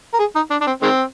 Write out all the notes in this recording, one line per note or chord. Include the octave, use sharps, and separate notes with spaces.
A#4
G#4
D#4
D4
D4
C4
D#3 G#3 C4